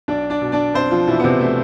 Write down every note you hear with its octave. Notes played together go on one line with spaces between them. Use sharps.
B1 D4 D5
D4 D5
B2
D4 D5
B1 C4 C5
F3 F4
B2 E3 E4
B3
C3 C4
B2 A3